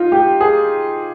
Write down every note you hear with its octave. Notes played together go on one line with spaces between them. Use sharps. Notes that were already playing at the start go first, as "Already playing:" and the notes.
Already playing: D#4 F4
G4
G#4